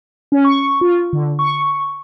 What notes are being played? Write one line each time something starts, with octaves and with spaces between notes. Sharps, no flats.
C#4
C#6
F4
D3
C#6